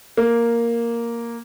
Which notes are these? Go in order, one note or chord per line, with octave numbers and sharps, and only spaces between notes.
A#3